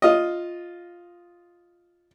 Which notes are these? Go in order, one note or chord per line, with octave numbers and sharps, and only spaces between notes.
F4 D#5